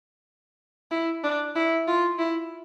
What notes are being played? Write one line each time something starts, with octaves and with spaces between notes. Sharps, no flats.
E4
D4
E4
F4
E4